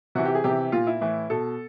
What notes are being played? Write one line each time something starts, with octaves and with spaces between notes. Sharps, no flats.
C3 E3 F#4
G4
G#4
C3 E3 G4
A#2 F4
E4
A2 E3
B2 A4